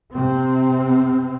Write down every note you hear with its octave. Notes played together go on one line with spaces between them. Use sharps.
C3 C4